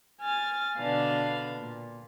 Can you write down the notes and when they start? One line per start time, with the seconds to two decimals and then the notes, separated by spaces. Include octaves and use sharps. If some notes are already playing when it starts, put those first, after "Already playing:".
0.21 G#5 F6 A6
0.77 B2 D3 D4 B4 F5
1.56 A#2